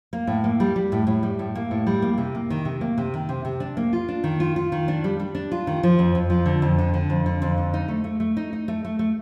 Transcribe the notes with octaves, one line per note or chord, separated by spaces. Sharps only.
A#3
A2
A#3
G3
G3
A2
A2
G3
A2
A#3
A2
G3
A#3
C3
A#3
D#3
C3
A#3
C3
D#3
C3
C3
D4
A#3
F4
D4
D#3
F4
F4
D#3
D4
G3
G3
D4
F4
D#3
F3
F2
F2
F3
D3
F2
D3
D3
F2
D3
F2
D3
D#4
A3
A3
A3
D#4
D#4
A3
A3
A3